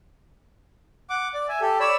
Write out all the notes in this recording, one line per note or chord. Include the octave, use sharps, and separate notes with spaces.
F#5 D6
D5
E5 G#5
G4 A4
C#5 D5 B5 E6